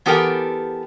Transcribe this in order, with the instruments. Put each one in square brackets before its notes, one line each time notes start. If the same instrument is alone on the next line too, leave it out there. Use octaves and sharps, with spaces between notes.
[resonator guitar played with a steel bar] E3 B3 G4 A4 A#4 G5